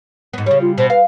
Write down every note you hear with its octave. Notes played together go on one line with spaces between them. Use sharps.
G#2 B3
C#3 G3 C#5
F4
B2 C5
B4 F5